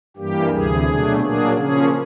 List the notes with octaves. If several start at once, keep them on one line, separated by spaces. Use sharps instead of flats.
G2 E3 G3 A#3 G4
D2 C3 E3 G#4
B2 F#3 A3 D4
A#2 F#3 A#3 D4 G#4
C#3 F3 A#3 C#4 G#4